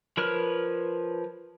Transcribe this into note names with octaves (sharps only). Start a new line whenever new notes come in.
F3 A#4 B4 C#5 F6